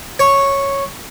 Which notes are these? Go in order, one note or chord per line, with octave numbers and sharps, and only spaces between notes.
C#5